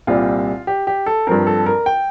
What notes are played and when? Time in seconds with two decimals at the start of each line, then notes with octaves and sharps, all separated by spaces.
0.07 C2 A#2 G3 C4 F4
0.67 G4
0.87 G4
1.06 A4
1.27 G2 F3 C4 A#4
1.47 A4
1.66 A#4
1.86 G5